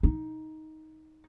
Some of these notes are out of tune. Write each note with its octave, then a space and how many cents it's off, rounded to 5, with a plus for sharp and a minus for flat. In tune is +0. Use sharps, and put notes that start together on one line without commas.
D#4 +10